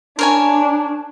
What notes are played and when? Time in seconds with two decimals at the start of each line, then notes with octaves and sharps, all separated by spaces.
0.19 D4 A#4 C#5 G#5